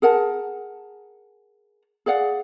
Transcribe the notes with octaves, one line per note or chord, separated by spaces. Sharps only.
G#4 A#4 F#5 A5
G#4 D5 F5 F#5